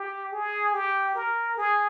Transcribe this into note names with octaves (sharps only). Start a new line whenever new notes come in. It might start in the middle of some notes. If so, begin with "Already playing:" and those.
Already playing: G4
G#4
G4
A#4
G#4